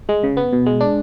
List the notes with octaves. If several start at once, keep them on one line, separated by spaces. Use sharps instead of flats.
G#3
C#3
B3
B2
G#3
D4